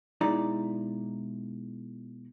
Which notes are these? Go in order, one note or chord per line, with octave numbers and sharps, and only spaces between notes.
B2 G#3 D#4 E4 D5 A#5